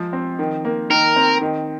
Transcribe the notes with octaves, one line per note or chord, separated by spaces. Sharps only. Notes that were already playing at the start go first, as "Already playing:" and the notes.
Already playing: F3 G#3
C4
D#3
A#3
D#3 A#4
C4
D#3